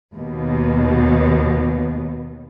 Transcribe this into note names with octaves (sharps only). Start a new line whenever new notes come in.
D#2 B2